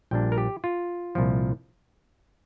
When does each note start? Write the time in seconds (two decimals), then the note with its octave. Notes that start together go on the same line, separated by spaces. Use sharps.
0.11 A#1 A#2 G3 A#3 D4 G5
0.32 A#4
0.38 G4
0.64 F4
1.15 C2 A#2 F3